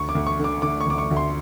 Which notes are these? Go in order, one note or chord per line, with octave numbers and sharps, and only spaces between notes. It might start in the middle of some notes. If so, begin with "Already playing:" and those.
Already playing: D2 C#6
D6
D2
C#6
D3
D6
D3 D6
C#6
D2 D6
C#6
D2
C6